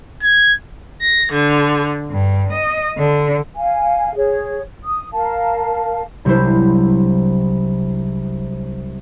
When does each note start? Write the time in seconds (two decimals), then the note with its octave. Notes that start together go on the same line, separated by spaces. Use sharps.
0.23 G#6
1.01 A#6
1.32 D3
2.10 G2
2.52 D#5
2.98 D3
3.56 F5 G#5
4.16 G#4 C#5
4.85 D#6
5.13 A#4 F5 A5
6.25 C2 C3 F#3 D4 E4 C5